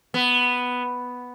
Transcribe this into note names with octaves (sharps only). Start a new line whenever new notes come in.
B3